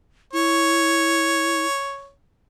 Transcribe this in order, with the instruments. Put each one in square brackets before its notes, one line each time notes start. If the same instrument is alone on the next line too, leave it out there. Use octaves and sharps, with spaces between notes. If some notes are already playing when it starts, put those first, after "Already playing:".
[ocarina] E4 [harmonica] C#5